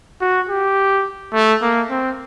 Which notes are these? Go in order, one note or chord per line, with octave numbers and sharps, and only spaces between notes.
F#4
G4
A3
A#3
C4